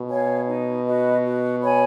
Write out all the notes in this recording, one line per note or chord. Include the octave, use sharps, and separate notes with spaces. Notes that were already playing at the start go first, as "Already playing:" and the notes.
Already playing: B2
C#5 F5 G#5
D#4
F#4 B4 D#5
F#4
C#5 G#5 B5